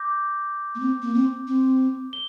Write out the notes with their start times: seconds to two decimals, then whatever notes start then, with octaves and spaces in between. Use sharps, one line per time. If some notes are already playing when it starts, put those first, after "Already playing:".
Already playing: D6 G6 A#6
0.75 A#3
0.80 C4
1.02 A#3
1.14 C4
1.47 C4
2.13 G7